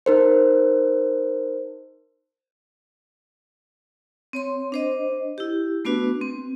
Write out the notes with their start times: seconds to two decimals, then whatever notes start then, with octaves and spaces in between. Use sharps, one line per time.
0.06 D#4 A#4 C5
4.33 C4 C#5 C6
4.72 D4 C5 D#5
5.38 E4 G4
5.85 A3 B3 D4 F#4 B4
6.21 C4